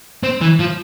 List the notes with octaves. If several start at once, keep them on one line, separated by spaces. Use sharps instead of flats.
C4
E3
F3